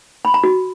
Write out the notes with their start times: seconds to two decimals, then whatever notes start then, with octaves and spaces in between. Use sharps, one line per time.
0.25 B5
0.34 A#5
0.44 F#4